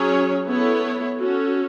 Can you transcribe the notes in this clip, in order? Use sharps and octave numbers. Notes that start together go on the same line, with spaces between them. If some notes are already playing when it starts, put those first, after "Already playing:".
Already playing: F#3 C#4 G#4 C#5
B3 E4 A4 C#5
C#4 F#4 A4